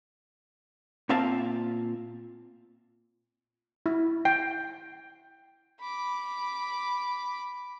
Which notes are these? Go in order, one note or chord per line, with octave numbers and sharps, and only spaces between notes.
A#2 A#3 C4 E5 F5 A5
E4
G5
B5 D6